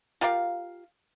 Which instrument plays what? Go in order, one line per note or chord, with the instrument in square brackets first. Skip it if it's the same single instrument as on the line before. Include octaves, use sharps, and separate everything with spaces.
[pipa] F4 G4 A#4 F5